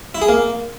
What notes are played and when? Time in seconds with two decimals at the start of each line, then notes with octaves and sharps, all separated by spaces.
0.15 E4
0.22 G#4
0.29 A#3